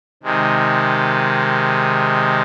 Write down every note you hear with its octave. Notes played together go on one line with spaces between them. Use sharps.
C3 D#3 G#3